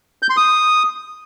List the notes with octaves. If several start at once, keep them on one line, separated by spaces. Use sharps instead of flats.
G6
C6
D#6